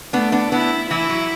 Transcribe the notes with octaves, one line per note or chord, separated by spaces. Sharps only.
A3 B3 D4
B3 D4
B3 D4 E4
E3 E4
F#3